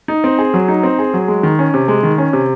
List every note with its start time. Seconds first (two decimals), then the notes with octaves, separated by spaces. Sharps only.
0.08 D#4
0.24 C4
0.39 G#4
0.54 F#3
0.68 D#4
0.83 C4
0.99 G#4
1.14 F#3
1.28 G#3
1.43 D#3
1.59 C#4
1.74 C3
1.88 G#3
2.03 D#3
2.18 C#4
2.33 C3